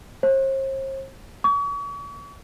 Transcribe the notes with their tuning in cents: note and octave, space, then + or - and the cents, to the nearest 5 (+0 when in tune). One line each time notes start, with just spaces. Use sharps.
C5 +40
C#6 +40